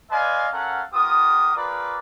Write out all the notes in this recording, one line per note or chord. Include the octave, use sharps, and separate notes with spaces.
B4 D5 D#5 F5 G#5 C6
C#4 A4 A#4 F5 F#5
B3 F4 G4 A#4 D#6
F4 G#4 A#4 B4 D5